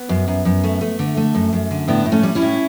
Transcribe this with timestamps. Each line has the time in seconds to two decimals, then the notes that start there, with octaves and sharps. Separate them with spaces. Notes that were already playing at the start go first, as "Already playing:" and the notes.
Already playing: B3
0.09 F#2
0.28 F#2
0.45 F#2
0.64 A3
0.81 A3
0.99 D3
1.17 A3
1.35 F#2
1.53 F#2
1.71 D3
1.88 A2 B3 D4
2.06 A2
2.12 A3 C#4
2.23 G3
2.35 C#4 E4
2.42 A2